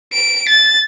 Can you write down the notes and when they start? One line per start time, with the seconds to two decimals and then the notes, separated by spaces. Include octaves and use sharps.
0.13 D7
0.49 A6